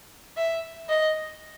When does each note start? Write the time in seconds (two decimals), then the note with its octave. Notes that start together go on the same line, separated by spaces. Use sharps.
0.37 E5
0.89 D#5